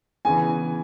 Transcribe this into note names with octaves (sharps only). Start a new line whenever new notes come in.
E2 C#3 E3 G#5